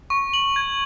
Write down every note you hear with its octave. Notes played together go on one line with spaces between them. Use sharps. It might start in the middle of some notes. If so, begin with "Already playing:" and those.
C#6
F#7
G#6